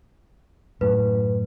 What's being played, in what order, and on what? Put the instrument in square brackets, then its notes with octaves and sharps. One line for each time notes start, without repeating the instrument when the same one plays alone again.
[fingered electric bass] F#2 A2 [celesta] B4